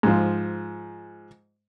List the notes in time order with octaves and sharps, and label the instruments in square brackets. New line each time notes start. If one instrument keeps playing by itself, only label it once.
[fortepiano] G#2 F3